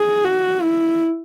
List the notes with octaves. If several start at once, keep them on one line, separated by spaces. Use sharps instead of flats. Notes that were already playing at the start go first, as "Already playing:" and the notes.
Already playing: G#4
F#4
E4